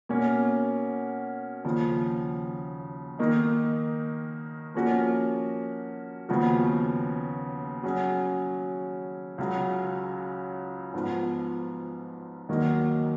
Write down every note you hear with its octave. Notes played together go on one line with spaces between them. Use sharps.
B2 A#3 C#4
D#2 C#3 F3
D#3 A#3 D#4
F3 A#3 C#4 F#4 A#4
D#2 C#3 F3 B3 F#4
F#3 C#4 G#4
C#2 C#3 F#3
G#2 F3 B3
D#2 D#3 F#3 A#3 D#4